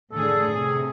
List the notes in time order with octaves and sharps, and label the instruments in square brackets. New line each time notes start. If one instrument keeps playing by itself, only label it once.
[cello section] A2 D3 G#4 [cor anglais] A4
[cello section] C3 [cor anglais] G#4